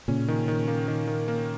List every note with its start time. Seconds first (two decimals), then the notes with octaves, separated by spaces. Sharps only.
0.08 A#2 C#3 C#4
0.28 D#3
0.48 D#3
0.68 A#3
0.88 D#3
1.07 D#3
1.28 A#3